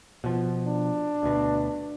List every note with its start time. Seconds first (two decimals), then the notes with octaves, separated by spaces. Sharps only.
0.24 B2 F3
0.67 D4
1.23 D2 B2